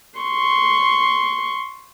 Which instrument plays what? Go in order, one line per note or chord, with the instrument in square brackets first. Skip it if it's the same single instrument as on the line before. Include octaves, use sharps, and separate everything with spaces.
[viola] C6 C#6